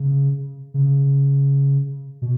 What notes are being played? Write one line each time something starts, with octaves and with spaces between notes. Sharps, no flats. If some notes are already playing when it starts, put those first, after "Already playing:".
Already playing: C#3
C#3
B2